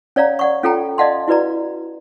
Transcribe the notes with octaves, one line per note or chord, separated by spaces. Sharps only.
C#4 C#5 D5 F5 A#5
D5 F#5 C#6
C#4 F4 A4 F#5 G5 A#5
D5 D#5 F5 F#5 A5 C6
E4 F#4 B4 D5 A#5